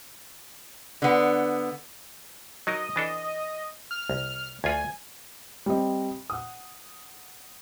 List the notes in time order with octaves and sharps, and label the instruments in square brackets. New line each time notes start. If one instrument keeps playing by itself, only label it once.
[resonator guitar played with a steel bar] D3 B3
[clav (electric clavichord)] F#3 D#4 A#4 [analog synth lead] D#5
[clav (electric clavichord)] E3 D4 A4
[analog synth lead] F6
[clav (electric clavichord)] C2
[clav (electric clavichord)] D2 F4 F#5 [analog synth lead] G#5
[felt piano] G3 C4 D#5
F#5 D#6